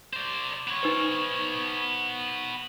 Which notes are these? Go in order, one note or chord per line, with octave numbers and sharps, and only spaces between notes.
C5 D5
B3 C#5
D#4 B4 C5